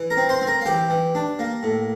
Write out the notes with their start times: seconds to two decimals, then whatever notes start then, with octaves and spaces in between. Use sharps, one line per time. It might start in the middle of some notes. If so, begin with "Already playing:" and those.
Already playing: E3
0.10 A#4 A#5
0.17 C4
0.29 C5 C6
0.41 C4
0.47 A#4 A#5
0.61 F5
0.65 E3 G4 G5
0.90 E3
1.15 D4
1.39 A#3
1.63 A2